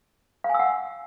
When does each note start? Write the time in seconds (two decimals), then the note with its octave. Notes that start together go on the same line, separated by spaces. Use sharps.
0.44 F5
0.49 G#5
0.54 E6
0.59 F#5